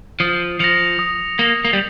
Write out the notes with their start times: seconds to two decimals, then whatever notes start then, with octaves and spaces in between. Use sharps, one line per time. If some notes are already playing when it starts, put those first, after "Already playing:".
0.20 F3 D#6
0.60 F3 A#6 C#7 F7
0.99 D#6
1.38 A#3 A#6 C#7 F7
1.65 A#3
1.73 G3